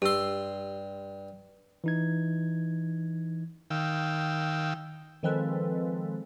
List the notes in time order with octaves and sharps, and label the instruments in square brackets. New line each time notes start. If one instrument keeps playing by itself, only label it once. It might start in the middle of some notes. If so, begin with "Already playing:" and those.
[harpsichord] G2 C6 [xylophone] G4 E6
[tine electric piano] E3 D#4 G#6
[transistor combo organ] D#3 F5 G5 E6
[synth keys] D#3 F3 G#3 C4 A4 B4